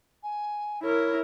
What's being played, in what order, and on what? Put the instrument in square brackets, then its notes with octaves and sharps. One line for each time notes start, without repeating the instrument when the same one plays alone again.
[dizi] G#5
[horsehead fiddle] E4 A#4 [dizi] C#5